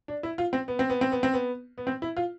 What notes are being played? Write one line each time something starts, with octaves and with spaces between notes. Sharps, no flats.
D4
E4
F4
C4
B3
C4
B3
C4
B3
C4
B3
B3
C4
E4
F4